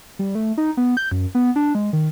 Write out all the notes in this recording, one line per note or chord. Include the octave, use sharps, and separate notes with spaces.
G3
A3
D#4
B3
G6
F#2
B3
D4
G#3
D#3